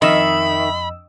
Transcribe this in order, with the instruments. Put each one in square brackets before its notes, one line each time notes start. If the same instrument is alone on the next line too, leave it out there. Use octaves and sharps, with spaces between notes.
[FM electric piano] F2 D#5 E6 [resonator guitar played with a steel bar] D#3 [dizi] E5 [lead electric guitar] B5